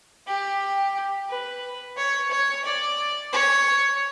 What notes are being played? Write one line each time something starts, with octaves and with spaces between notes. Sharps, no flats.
G4
B4
C#5
C#5
D5
C#5